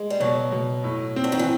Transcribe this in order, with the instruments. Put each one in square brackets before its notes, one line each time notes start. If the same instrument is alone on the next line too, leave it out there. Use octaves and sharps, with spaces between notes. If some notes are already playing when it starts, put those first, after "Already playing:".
Already playing: [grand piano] G#3
[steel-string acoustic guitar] G3
[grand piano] B2 [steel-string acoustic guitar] F#3
[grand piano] B2
A2
C4
[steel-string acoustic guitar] D3
D#3
E3